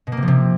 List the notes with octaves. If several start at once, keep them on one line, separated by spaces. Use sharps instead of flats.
B2
A#3
C3
F3
C3